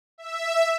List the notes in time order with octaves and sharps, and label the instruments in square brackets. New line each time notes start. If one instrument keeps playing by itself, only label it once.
[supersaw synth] E5